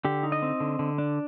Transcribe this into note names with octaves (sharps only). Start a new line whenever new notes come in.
D3 G4
D#4
D#5
C4
D3
D3
D4